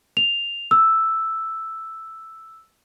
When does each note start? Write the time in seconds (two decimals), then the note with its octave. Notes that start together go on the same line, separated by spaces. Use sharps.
0.17 F7
0.71 E6